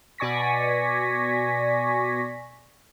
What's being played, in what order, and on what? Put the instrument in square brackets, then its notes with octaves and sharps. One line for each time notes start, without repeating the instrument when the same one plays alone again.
[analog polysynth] B2 D5 G#5 C#6 A#6 B6